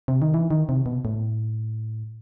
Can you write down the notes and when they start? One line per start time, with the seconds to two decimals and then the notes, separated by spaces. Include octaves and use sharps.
0.08 C3
0.22 D#3
0.34 E3
0.51 D#3
0.69 C3
0.86 B2
1.05 A2